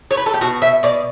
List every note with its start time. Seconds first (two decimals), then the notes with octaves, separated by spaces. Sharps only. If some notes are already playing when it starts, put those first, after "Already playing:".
0.11 C#5
0.17 B4
0.26 A4
0.34 G4
0.41 B2 F#4
0.62 B2 E5
0.83 B2 D5